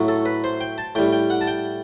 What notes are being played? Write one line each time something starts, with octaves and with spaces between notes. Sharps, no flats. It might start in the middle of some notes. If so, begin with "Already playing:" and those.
Already playing: A2 F#3
A4
B4
C5
G5
A5
A2 G3 G5
G5
F#5
A5
G5